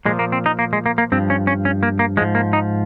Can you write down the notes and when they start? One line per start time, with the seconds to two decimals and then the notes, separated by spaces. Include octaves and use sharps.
0.05 A#2 F3 G#3
0.19 A#3
0.32 C4
0.46 D#4
0.59 A#3
0.73 G#3
0.86 A#3
0.98 A#3
1.12 G2 F3 C4
1.30 C#4
1.47 C#4
1.65 C#4
1.83 A#3
1.99 A#3
2.17 G#2 F3 G#3
2.35 A#3
2.53 D#4